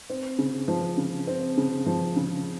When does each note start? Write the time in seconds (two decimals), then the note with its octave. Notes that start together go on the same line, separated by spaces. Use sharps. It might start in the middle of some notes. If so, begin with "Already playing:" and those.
0.10 C4
0.39 C#3
0.68 F3
0.98 C#3
1.27 C4
1.57 C#3
1.86 F3
2.16 C#3